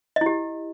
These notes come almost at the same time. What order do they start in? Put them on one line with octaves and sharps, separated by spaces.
D#5 E4 G4